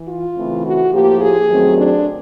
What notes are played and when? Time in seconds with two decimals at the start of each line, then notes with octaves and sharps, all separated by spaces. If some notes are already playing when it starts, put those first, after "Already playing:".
Already playing: E3
0.08 F4
0.36 C#3 E3 A3 C4
0.64 F#4
0.92 A2 F3 A#3 G4
1.20 G#4
1.49 F#2 D#3 F#3 A3 C4
1.76 D4